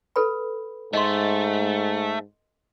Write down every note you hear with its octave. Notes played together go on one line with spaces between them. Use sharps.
A4 B4 B5
G#2 A3 D#5 C6